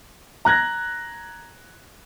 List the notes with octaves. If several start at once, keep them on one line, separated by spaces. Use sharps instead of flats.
A#5 F#6 G#6 A#6